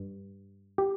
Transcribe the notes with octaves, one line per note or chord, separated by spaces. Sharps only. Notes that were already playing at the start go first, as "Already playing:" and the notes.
Already playing: G2
G4